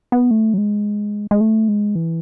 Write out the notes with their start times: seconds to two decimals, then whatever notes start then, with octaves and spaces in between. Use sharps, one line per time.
0.12 B3
0.31 A3
0.54 F#3
0.58 G#3
1.31 G#3
1.41 A3
1.68 G#3
1.95 E3